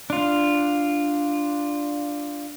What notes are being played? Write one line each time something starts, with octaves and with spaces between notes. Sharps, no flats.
D4 F4